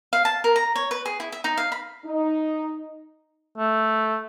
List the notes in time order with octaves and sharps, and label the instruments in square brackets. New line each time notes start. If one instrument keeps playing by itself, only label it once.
[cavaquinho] F5
A5
A#4
A#5
C#5
B4
G#4
E4
E5
D#4
F5
B5
[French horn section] D#4
[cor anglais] A3